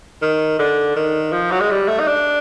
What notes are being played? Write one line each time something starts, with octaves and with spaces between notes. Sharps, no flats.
D#3
D3
D#3
F3
F#3
G#3
G3
A3
D#4
D4